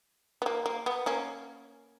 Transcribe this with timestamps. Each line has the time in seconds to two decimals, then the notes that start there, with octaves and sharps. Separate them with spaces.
0.42 B3
0.46 A#3
0.66 A#3
0.86 B3
1.06 A#3 C#4